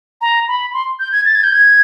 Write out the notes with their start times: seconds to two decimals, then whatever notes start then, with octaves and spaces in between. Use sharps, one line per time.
0.21 A#5
0.48 B5
0.74 C6
0.99 G6
1.12 G#6
1.26 A6
1.35 G#6
1.44 G6
1.53 G#6